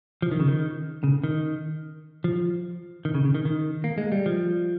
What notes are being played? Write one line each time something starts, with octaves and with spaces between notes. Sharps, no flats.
F3
D#3
C#3
D#3
C#3
D#3
F3
D#3
C#3
C#3
D#3
D#3
A#3
G#3
G3
F3